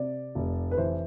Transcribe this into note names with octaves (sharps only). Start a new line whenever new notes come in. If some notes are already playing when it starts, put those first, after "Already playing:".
Already playing: C3 D5
F1
B4
E3 C5